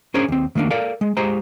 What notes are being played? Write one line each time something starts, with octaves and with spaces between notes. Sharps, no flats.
C#4 D4 G#4 A#4 C5 C#5
D#2 C4
D#3 A3 A#3 C4 D4
A4 A#4 D5 F5
G#3
G#3 G4 C5 A#5